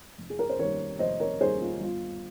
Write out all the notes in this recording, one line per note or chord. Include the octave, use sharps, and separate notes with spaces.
F1
G#4
A#4
C5
D#2 D#3 G3 A#4 C#5
F1 C5 D#5
A#4 C#5
D#2 D#3 G3 G#4 C5
F4
G1 F4